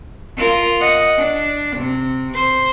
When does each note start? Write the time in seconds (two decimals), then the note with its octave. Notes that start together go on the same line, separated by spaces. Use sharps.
0.37 F4 A#4
0.80 D#5 F#5
1.18 D4
1.76 C3
2.34 C5